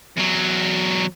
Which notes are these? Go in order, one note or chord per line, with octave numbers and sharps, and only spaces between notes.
E2 F#3